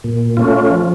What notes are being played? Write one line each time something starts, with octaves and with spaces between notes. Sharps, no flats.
A#2
A3 C#4 F4
F3